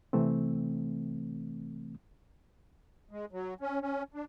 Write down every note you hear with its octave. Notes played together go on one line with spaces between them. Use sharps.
C3 E3 A3 C4
G#3
F#3
C#4
C#4
D4